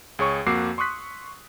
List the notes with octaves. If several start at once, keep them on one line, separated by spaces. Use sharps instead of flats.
C#2 G#4 C#5 C#6
F2 A#3 F#4 D6 E6 C7
C6 C#6 D#6 F#6 B6